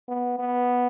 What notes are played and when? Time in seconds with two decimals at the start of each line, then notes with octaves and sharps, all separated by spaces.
0.08 B3
0.39 B3